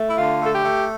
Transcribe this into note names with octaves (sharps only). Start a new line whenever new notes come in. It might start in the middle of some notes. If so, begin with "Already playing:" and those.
Already playing: A3
E4
D3 F4
A3 A4
G4
A3